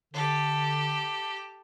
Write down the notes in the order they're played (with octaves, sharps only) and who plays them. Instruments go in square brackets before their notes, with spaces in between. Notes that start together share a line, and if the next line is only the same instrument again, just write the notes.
[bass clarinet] D3 [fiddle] G4 A4